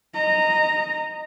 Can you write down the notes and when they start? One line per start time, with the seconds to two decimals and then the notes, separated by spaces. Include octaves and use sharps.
0.14 D#5 A#5